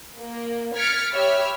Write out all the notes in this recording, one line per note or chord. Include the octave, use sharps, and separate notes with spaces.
A#3
F6 G#6 A6 B6 C#7 D7
G4 C#5 E5 B5 E6 F6